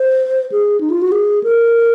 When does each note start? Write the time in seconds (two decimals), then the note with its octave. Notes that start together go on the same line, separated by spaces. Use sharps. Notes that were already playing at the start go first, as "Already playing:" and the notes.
Already playing: C5
0.52 G#4
0.81 D#4
0.90 F4
1.02 F#4
1.12 G#4
1.44 A#4